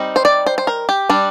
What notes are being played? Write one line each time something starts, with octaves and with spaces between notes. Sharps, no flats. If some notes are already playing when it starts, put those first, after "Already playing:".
Already playing: G3 C4 D#4
C5
D5
C5
C5
A#4
G4
G3 D4